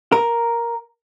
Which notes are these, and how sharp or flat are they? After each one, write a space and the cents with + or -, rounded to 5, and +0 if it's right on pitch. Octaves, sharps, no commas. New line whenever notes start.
A#4 +5